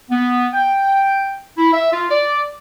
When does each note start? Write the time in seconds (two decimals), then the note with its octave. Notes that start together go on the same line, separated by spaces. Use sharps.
0.10 B3
0.54 G5
1.57 E4
1.73 E5
1.93 F4
2.10 D5